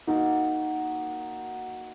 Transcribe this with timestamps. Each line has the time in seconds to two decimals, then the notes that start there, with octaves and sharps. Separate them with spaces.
0.07 A#3 D#4 F#4 A#4